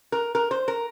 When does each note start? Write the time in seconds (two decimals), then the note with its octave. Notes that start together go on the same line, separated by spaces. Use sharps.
0.12 A#4
0.35 A#4
0.51 C5
0.68 A#4